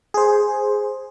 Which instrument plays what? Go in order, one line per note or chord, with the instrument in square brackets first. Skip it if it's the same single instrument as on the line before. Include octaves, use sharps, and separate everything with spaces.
[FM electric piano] G#4 C5